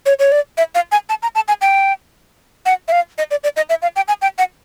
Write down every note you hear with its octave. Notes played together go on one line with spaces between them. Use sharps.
C#5
C#5
D5
E5
F5
G#5
A5
A#5
A5
G#5
G5
F#5
E5
F5
D#5
D5
D5
D#5
E5
F5
G5
G#5
G5
F#5